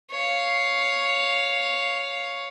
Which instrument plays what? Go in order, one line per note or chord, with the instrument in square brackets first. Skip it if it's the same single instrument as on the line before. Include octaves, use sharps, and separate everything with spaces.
[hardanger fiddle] C#5 F5